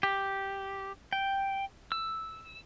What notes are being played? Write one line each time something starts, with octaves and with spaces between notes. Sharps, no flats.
G4
G5
E6